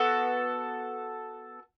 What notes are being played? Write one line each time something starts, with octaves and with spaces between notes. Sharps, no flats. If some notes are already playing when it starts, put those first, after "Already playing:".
Already playing: B3 F#4 A4